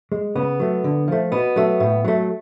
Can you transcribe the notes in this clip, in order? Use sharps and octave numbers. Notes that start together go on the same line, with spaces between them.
G#3
C#3 B3
F#3 A3
D3
F3 A3
B2 B3
F#3 A3
A2
F#3 A3